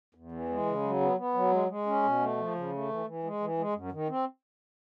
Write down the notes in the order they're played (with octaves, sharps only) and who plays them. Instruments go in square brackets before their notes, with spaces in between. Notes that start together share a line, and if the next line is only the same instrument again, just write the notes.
[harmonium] E2
E3
G#3
C#3
F#3
B3
B3
F#3
G#3
G#3
C#4
B2
A3
F3
C#3
A3
E3
E3
G#3
E3
G#3
F#2
D#3
C4